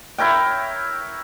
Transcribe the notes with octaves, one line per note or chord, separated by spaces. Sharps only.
E4 A#4 C#5 G5